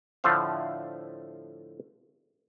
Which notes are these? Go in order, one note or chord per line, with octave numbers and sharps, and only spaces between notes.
A2 D3 F3 A3 C5 F5